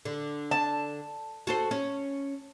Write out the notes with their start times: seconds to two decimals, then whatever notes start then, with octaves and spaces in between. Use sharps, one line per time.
0.05 D3
0.51 A5
1.47 F#4 A4 C5
1.71 C#4